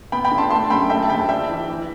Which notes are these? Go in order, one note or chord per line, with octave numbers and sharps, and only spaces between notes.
B3 G5 B5
G5 B5
D3
A5 C6
A3 A5 C6
F#2 G5 B5
A3 E5 G5
A5
D2 G5 B5
D4 E5 G5
E3
E3